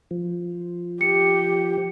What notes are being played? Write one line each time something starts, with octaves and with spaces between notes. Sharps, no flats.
F3
G4 C#7